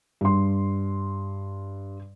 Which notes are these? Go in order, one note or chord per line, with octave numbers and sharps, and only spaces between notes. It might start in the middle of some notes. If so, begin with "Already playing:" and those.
G2 C6